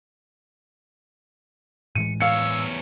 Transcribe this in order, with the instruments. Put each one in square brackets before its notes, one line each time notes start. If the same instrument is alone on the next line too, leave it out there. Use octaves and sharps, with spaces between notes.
[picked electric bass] A2 E3 G#3 [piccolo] C#7 [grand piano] D#7
[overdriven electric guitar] E2 C#5 [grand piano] F5 C#7 [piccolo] E6